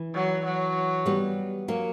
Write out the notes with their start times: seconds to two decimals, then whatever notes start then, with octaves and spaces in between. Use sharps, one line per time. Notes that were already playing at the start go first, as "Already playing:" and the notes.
Already playing: E3
0.14 F#3
0.45 F#3
1.06 G3 B3
1.68 F#3 A#3